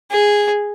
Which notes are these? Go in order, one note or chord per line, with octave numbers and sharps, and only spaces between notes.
G#4